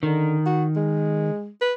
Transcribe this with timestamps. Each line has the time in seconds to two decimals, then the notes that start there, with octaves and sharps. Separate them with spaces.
0.03 D3 D#3
0.46 F#4
0.76 G#3
1.61 B4